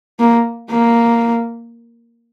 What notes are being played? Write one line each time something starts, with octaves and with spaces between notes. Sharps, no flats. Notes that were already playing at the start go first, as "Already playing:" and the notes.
A#3
A#3